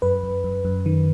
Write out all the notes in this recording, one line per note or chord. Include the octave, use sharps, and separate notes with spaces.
F#2 B4
F#2
F#2
F#2
D#3